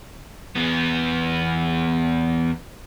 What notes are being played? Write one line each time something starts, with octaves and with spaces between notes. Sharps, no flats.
E2 B3